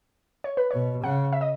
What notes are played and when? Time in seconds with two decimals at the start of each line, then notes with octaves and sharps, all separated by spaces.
0.44 C#5
0.57 B4
0.71 B2 C#5
1.03 C#3 F#5
1.33 E5
1.41 D#5